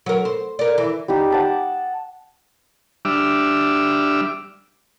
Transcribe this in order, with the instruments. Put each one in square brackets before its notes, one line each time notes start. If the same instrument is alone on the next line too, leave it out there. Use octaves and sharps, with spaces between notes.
[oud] F#3 A#4
C5
A#4 D5
E3
[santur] G3 D#4 G4
F#5 A5 D6
[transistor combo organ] G3 D4 E5 D6 E6 F6